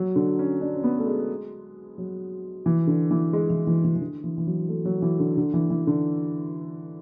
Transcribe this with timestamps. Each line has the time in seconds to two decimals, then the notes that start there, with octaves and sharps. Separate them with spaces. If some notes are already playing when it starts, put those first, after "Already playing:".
Already playing: F#3
0.16 D3
0.39 C#4
0.61 D4
0.76 C#4
0.84 B3
0.99 A3
1.07 G#3
1.98 F#3
2.66 E3
2.87 D3
3.11 E3
3.33 G#3
3.50 E3
3.67 E3
3.84 E3
3.96 E3
4.01 D3
4.24 E3
4.38 E3
4.47 F#3
4.69 A3
4.85 F#3
5.02 E3
5.20 D3
5.37 D3
5.54 E3
5.70 E3
5.87 D3